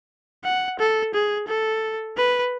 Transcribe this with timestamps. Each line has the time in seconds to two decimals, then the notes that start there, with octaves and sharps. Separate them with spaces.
0.44 F#5
0.79 A4
1.14 G#4
1.47 A4
2.17 B4